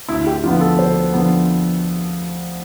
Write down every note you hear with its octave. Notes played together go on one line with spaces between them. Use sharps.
D2 E4
G4
D3 F3 B3 F4
A4
D2 C5
D3 F3 B3